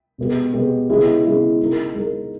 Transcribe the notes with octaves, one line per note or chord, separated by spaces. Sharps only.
B2 G#3 B3 G4
B2 G#3 B3 G4
C#3 G#3 B3 E4 G#4
C#3 G#3 B3 E4 G#4
G#3 D#4 A#4
G#3 D#4 A#4